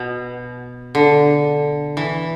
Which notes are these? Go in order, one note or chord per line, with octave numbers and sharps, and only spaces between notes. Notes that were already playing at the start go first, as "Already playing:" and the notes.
Already playing: B2
D3
E3